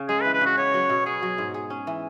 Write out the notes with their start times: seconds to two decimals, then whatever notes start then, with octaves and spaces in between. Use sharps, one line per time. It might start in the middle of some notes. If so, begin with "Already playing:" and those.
Already playing: C#3 C#4
0.09 G#3 G#4
0.22 B4
0.25 E3
0.34 B4
0.41 C#3 F#4
0.57 B3 C#5
0.74 F#3
0.89 B2
1.06 B3 G#4
1.22 F#3
1.38 G#2
1.54 G#4
1.70 C#4
1.87 E3